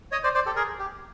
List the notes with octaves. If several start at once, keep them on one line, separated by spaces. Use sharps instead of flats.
C#5 D#5
C5 D5
C5 D5
G4 A4
G#4 A#4
G4